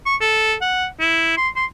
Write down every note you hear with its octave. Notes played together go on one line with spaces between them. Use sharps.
C#6
A4
F#5
E4
C6
C6